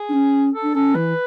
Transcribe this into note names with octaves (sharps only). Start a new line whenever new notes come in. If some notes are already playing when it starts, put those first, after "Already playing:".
Already playing: G#4
D4
C#4
A4
D4
C#4 A4
E3 B4